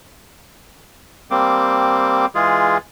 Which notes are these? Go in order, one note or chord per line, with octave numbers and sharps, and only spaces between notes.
G3 A#3 C4 D6
E3 G#3 F4 G#4